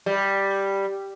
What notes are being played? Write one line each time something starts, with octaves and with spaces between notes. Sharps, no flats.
G3